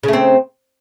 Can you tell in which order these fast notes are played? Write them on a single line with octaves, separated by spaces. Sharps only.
C#3 A3 C4